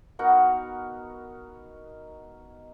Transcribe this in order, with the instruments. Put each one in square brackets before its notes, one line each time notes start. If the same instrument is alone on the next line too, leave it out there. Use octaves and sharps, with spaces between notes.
[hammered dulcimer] B3 D#4 F#4 A#4